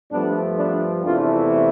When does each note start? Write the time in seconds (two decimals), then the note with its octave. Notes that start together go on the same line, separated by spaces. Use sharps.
0.12 G2 F3 A3 B3 D4
0.58 B3 D4
1.04 E2 C3 E3 A3 D4 F4